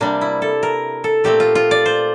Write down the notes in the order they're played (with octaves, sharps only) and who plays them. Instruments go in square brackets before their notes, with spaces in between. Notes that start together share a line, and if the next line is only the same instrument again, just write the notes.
[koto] C3 G3 A#3 D4
E4
A4
A#4
A4
A#2 A3 C4 G4
F4
F4
D5
C5